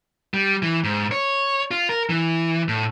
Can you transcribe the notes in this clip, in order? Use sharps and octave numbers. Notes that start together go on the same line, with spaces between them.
G3
E3
G#2
C#5
F4
A#4
E3
A2